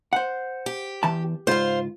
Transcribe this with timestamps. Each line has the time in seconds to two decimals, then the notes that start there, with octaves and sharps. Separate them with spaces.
0.13 C5 F#5
0.66 G4
1.03 E2 E3 A5
1.47 C#2 G#2 F4 C5 F5